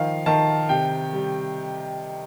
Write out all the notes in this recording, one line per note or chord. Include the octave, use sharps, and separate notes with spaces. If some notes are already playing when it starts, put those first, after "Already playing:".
Already playing: D#3 F3 F5
D#3 A5
C3 G5
G3